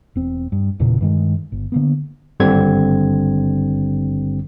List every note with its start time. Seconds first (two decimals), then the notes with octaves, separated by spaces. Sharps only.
0.15 E1 C4
0.52 G2
0.79 E1 E2 A#2 C#3
1.01 G2 D#3 G#3
1.52 G1
1.72 D3 A#3 B3
2.40 G#1 G2 D3 G3 C4 G#6